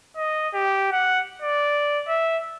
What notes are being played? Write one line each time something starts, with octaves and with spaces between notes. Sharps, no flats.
D#5
G4
F#5
D5
E5